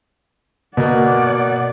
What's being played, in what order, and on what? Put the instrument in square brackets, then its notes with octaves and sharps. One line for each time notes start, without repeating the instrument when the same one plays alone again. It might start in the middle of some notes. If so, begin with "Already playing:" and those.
[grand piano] B2 A#3 [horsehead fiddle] D5 F#5